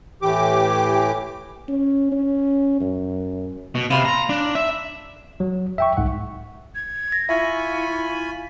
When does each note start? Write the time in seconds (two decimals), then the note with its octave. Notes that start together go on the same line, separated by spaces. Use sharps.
0.22 A2 E3 G4 D6
1.68 C#4
2.12 C#4
2.81 F#2
3.75 B2
3.90 C3 F4 B5 C6
4.05 A#5
4.29 D4
4.55 E5
5.40 F#3
5.78 E5 G5 C#6
5.97 C2 G#2 F#5
6.75 G#6
7.12 A#6
7.29 E4 F4 E5 G#5 B5 C#6